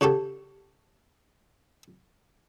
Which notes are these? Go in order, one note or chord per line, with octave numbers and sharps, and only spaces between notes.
C#3 F#4 G4 A4